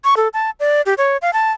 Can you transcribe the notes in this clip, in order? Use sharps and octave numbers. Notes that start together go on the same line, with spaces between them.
C#6
A4
A5
D5
G4
C#5
F5
A5